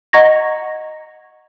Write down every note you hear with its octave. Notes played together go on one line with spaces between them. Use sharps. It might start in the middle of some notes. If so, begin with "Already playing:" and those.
D#5 F#5 A#5 C#6 G#6 A#6